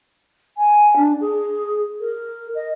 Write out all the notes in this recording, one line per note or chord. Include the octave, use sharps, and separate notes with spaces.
G#5
D4
G#4
A#4
D#5